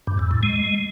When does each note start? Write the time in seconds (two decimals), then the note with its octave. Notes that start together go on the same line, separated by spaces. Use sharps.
0.07 G2
0.19 E2
0.31 A2
0.43 G#3